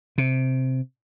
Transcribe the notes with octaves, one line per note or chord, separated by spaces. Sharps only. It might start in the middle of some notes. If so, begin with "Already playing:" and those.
C3